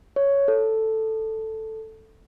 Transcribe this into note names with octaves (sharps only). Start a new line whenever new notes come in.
C#5
A4